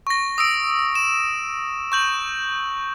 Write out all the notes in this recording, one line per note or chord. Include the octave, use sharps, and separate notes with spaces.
C#6 A#6
D#6 E6 D7
E7
C#6 G6 F#7